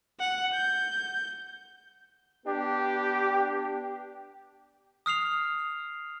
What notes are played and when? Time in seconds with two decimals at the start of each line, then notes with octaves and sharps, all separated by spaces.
0.20 F#5
0.54 G6
2.46 B3 D4 G4
5.06 D#6 F6 C7 F7